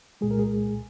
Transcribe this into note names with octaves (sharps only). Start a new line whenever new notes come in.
C2 A#2 G#3 G#4
A#4
G#4